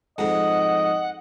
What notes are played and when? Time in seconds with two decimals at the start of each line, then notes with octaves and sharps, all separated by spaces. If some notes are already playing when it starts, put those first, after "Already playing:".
0.19 F2 G#2 D#5 F#5